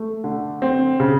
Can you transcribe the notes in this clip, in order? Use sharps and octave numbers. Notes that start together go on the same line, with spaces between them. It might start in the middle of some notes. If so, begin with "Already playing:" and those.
Already playing: A3
D3
C4
C#3